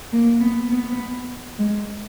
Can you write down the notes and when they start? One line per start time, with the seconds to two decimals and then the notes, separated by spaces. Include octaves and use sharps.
0.12 A#3
0.41 B3
0.71 B3
1.58 G#3